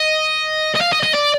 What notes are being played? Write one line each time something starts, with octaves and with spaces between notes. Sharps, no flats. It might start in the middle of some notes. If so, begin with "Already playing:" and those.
Already playing: D#5
D#5
F5
D#5
D#5
D5